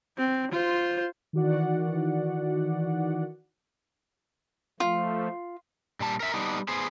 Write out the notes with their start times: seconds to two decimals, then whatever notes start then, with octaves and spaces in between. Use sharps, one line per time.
0.18 C4
0.52 F4 C5
1.33 D#3 E3 F#4 D5 F#5
4.80 F3 A3 F4
6.00 A#2 G3 A5
6.20 A#4 E5
6.34 G3 B3 D4 D#4
6.68 B3 G#4 C5